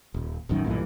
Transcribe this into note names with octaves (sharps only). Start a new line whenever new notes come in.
D#1
D#1 A1 F#2 D#3
B1 G2 A#2 E3